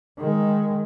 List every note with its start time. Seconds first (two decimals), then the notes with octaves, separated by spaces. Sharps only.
0.18 D#3 G#3